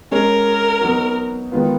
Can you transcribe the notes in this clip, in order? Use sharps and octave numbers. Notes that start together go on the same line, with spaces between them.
G#3 C#4 G#4 A#4 C#5
F#3 B3 D#4 F#4
D#3 G#3 B3 F4 B4